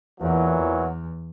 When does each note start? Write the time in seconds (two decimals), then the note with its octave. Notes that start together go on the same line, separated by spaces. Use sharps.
0.21 E2 A#2 E3 F#3
0.56 E2